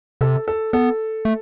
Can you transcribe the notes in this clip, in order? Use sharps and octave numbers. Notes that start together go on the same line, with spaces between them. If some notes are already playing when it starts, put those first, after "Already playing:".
C3 A4
A4
B3 A4
A3